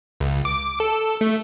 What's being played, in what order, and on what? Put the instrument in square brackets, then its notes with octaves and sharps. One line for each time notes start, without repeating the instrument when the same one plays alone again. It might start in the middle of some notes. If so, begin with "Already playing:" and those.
[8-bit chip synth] C#2
D6
A4
A3